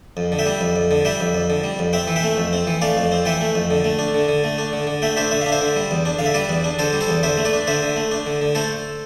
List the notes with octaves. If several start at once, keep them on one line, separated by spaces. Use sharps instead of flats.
F2
D3
E5 G5
G3
F2
F2
D3
G3 E5 G5
F2
F2
D3
G3
F2
C4 E5 G5
E3
E5 G5
A3
F2
C4
E3
A3 D5 F5
F2
C4
E3 E5 G5
A3
F2
D3
A3
D4
D3
D3
A3
D4
D3
D3
A3 E5 G5
D4 C5 E5
D3 E5
D4 F5
C5 E5
D3
G3
E2
D4
D3 F5
E5
G3 B4 D5
E2
D4
D3 A4 C5
G3
A4 C5
E2
D3 C5 E5
A3
B4 D5
D4
D3 C5 E5
D3
A3
D4
D3
D3
A3 A4 C5